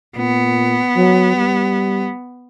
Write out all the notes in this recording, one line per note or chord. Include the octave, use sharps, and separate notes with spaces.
A#2 B3
F#3
G3